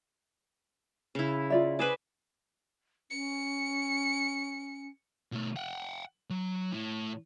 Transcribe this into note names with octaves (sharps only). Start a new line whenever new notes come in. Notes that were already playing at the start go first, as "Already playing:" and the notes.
C#3 E4
F4 D5 E5
G#4 B4 C5 D5
C#4 C#7
B2 A3
F#5 G5
F#3
A2